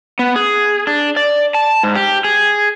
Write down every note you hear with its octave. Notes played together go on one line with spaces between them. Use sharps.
B3
G#4
D4
D5
A5
G#2
G4
G#4